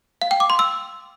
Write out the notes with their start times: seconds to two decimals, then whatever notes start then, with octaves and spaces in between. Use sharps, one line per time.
0.22 F5
0.31 G5
0.40 D6
0.50 C6
0.59 E6